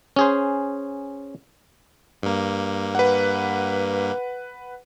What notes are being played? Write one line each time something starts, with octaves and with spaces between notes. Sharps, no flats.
C#4 G#4 C5
G2 A#3
B4 F#5